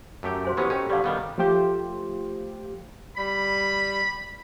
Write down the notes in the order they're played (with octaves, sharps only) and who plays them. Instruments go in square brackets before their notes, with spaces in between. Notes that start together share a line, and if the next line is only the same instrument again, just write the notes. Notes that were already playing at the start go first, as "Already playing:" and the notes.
[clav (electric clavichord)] F#2 A3 G4
[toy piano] F#4 C5 G#5
[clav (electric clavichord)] E3 B3 C#4 [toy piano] G4 C5
[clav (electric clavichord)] C#4 D#4 [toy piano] A4 G5
[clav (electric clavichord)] D3 G3 [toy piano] G4 D5 F5
[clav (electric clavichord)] D#3 G3 B3
[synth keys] F3 A3 F4 G4 C5
[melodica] G3 [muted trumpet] B5